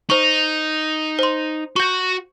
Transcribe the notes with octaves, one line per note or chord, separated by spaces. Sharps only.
D#4 C5 C#6
C5 C6
F#4 F#5 C#6 G6